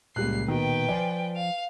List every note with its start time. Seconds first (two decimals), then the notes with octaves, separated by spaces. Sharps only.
0.16 C#2 A#2 G3 A#3 F#6 C7
0.48 B2 D#3 B4 G5
0.89 F3 C5 D5 G#5
1.36 F5